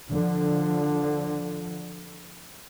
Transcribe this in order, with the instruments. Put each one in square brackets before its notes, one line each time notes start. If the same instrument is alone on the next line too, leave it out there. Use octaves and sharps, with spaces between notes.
[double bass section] D3 F3